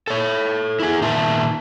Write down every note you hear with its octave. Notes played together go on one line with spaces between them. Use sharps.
A4 C#5
E4 G#4
A#2 D#3 E5 A5